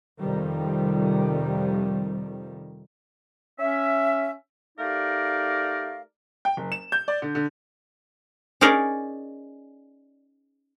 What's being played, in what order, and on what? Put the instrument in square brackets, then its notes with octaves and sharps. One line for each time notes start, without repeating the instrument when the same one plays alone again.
[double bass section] F2 C3 D#3 G3
[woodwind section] C#4 E5
A3 D#4 G4 A#4 D5 F5
[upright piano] G5
F#1
E7
G6
D5
D3
D3
[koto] C#4 D#4 G#4 A#4 D5